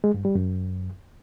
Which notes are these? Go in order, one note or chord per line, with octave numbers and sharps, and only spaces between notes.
G#3
G2
G3
F#2